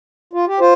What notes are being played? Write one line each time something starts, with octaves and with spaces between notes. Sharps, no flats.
F4
G4
F4 C5